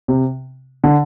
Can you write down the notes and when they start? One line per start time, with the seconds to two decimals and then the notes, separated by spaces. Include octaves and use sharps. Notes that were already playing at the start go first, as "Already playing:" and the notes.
0.08 C3
0.84 D3